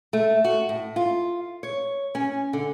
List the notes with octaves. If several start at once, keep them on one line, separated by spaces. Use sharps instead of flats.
A3
F#4
A2
F4
C#5
C#4
D3